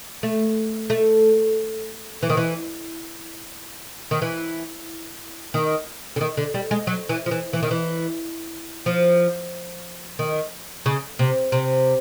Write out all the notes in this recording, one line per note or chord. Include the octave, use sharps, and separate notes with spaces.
A3
A3
E3
D#3
E3
D#3
E3
D#3
D3
D#3
D3
G3
G#3
F#3
E3
F3
E3
E3
D#3
E3
F3
D#3
C#3
C3
C3